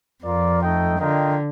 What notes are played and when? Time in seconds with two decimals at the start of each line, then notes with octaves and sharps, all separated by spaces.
0.24 F2 F4 A#4 D5
0.62 A3 D#4 A4 D#5 G5
0.99 D3 F4 A#4 D#5 G5